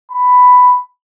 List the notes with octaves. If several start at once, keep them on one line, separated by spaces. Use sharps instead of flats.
B5